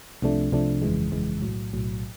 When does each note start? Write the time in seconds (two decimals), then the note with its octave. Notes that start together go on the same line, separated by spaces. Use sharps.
0.22 C2 C3 F3 A3 D4
0.52 C2 C3 F3 A3 D4
0.82 G1 F2 C#3 E3 G#3
1.12 G1 F2 C#3 E3 G#3
1.42 B1 A2 F#3
1.73 B1 A2 F#3